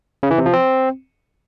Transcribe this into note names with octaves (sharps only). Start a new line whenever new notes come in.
C#3
E3
C3
F3
C4